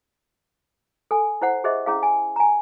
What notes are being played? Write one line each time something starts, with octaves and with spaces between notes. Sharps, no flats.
A4 G#5
E4 C5 F#5
G4 G#4 C5 D#5 E5
C#4 E4 G#4 F5
G#5
G#5 A#5